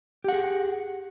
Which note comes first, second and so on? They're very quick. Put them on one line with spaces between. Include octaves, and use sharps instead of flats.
G4 F#5 G#4